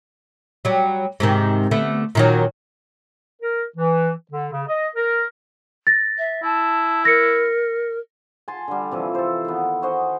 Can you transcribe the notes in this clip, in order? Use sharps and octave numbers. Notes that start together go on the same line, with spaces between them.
F#3 G3
G#2 C3 D#3
D3 A3 B3
A#2 D#3 F#3
A#4
E3
D3
C#3
D#5
A#4
A6 A#6
E5
E4 A5
A#4 A#6 C#7
G#5 A5 C6
D3 G3
C3 E3 F3
A4 C5
D#3 B3
F#4 C5 D#5 G#5